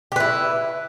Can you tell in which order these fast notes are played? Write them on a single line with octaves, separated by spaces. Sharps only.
G4 B4 E4